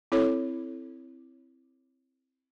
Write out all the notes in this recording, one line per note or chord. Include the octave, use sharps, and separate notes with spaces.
C4 E4 A4 C#5